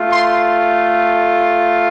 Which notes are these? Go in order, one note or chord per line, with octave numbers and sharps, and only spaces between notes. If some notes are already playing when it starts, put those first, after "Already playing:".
Already playing: A3 F4
C6